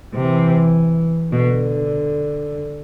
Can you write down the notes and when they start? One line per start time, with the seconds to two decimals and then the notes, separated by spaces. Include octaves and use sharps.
0.14 C3 E3
1.32 B2 D3